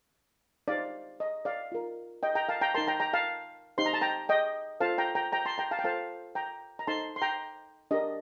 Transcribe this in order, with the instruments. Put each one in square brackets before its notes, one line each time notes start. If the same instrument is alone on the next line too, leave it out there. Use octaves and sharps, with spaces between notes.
[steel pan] D#4 G4 C5 D5 F5
D#5
D5 F5
F4 A#4
D#5 G5
G5 A#5
F5 A5
G5 A#5
D#4 A#4 A5 C6
G5 A#5
G5 A#5
F5 A5
D#4 G4 C5 C6
A#5
A5
G5 A#5
D#5 G5
F4 A4 C5 F5 A5
G5 A#5
G5 A#5
G5 A#5
A5 C6
G5 A#5
F5 A5
G5
F4 A4 C5 F5 A5
G5 A#5
A#5
D#4 A4 C5 A5 C6
C6
G5 A#5
D4 G4 A#4 D#5